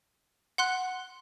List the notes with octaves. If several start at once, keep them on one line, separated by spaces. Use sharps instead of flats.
F#5 C6 F#6